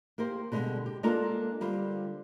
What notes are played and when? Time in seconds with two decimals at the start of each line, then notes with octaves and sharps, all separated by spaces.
0.18 A#3 G4 A#4 C5
0.52 B2 D3 G3 G#3
0.86 G4
1.03 G#3 A#3 D4 F4 A4 A#4
1.61 D3 G3 F4 C5